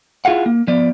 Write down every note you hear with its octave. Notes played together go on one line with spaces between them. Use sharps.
E4 F4 G#4 F5 F#5
A#3
F3 B3 D5